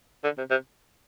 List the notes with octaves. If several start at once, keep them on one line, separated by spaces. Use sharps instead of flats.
D3
C3
C3